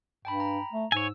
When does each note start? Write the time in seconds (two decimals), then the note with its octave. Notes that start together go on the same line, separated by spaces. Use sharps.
0.25 G2 G5 A5 B5
0.40 A#5
0.73 A3
0.92 G#2 C#5 G#5 E6